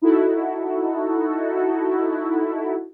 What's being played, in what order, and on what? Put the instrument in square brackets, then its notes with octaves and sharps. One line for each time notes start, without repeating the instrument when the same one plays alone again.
[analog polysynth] D#4 E4 F#4 A4